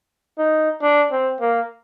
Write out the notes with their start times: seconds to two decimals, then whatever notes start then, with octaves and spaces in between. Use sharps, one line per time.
0.38 D#4
0.82 D4
1.12 C4
1.40 A#3